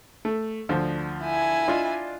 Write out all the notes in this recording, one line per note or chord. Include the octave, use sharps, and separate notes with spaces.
A3
D2 F3
E4 G#5
D4 F4 D#5